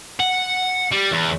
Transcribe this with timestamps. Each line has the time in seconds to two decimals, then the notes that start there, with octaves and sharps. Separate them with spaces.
0.20 F#5
0.92 G3
1.12 E2